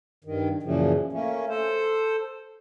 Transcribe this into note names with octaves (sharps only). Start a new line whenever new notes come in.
G2 D#3
F#2 A#2 C#3 E3 F3
A3 A#3 C#4
A4 C5